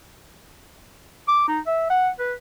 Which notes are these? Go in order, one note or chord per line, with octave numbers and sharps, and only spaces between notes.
D6
D#4
E5
F#5
B4